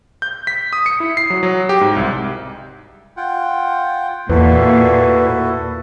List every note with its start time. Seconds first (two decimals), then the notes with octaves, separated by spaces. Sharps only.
0.22 G6
0.47 B6
0.73 D#6
0.86 C#7
1.00 E4
1.17 C7
1.30 F#3
1.43 F#3
1.69 G4
1.81 G#2
1.96 C2
3.17 F4 F#5 G5
4.30 E2 A#2 E4 F#4 A4 B4